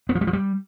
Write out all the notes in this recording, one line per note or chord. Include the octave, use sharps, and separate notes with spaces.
B3
F3
G3
F3
G3